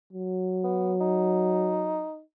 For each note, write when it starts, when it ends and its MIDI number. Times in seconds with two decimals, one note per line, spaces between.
0.12 2.07 54
0.64 0.93 59
1.01 2.21 63